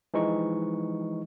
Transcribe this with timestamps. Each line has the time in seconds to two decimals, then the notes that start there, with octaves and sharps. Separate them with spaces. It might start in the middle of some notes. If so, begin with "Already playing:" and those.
0.14 E3 F3 G#3 D#4 C#6